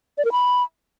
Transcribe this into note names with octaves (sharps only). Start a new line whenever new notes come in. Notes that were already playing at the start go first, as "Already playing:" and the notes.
D5
A#4
B5